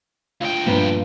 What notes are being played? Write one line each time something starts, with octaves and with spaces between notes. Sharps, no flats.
D2 F4 G5
G2 A#2 F3 G3 B3 D4